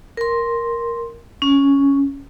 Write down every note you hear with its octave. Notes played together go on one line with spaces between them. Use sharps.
A#4 C6
C#4